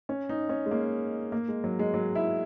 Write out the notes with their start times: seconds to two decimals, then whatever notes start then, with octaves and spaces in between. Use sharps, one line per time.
0.09 C#4
0.29 D#4
0.49 C#4
0.66 G#3
0.71 A#3
1.32 A#3
1.48 G#3
1.64 F#3
1.79 G#3
1.94 F#3
2.15 E4